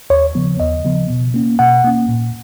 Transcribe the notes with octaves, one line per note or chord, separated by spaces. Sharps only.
D#2 C#5
C#3 F3 B3
D#2 D#5
C#3 F3 B3
B2
A#3 C#4
B2 F#5
A#3 C#4
A#2